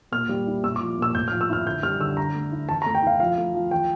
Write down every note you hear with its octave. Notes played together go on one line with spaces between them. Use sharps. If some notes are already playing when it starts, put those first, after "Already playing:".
A#2 F6
G3
E4
A#2 E6
D6
F3
A#2 E6
A2 G6
F6
F3
E6
E4 F6
D3 G6
G3 F6
D3 E6
D3 A#5
A3
E4
E3 A5
A#5
A3
G5
E4 F5
F3 F5
A3
F3
E3 G5